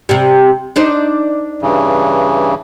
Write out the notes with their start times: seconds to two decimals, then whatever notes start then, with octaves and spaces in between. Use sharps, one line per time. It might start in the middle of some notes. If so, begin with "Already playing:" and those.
0.09 C3 G3
0.76 D4 D#4 C5
1.62 G2 C#3 E3